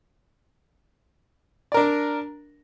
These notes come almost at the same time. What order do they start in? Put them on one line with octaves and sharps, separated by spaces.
D5 A#4 D4